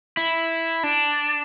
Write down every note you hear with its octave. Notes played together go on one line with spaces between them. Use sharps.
E4
D4